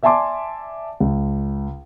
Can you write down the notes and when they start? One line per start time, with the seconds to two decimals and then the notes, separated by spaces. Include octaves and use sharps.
0.03 D5 E5 G#5 A5 C6 D6
1.00 C#2